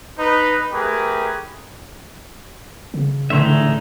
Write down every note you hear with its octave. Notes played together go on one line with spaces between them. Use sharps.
D#4 B4
A3 G4 G#4 A#4 B4
C#3
A2 D3 E3 G#3 D#4 E5 C6